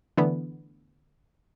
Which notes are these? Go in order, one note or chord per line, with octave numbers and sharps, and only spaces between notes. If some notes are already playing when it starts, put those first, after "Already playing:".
D3 E3 A3 B3